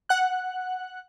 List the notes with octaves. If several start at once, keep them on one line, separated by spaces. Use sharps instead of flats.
F#5 F#6